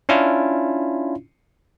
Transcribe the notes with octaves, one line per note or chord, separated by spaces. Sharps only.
C#4 D4 E4 F4